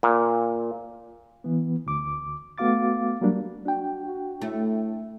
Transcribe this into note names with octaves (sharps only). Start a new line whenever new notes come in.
A#2
E3 B3
D2 D6
A3 B3 F#4 F5 D6 A6
F#3 G3 A#3 D4
D4 F#4 G5
F#4
A2 A3